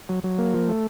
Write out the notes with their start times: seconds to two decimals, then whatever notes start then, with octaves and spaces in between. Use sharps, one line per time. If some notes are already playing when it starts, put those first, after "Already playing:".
0.09 F#3
0.24 F#3
0.38 A#3
0.54 F3
0.69 A3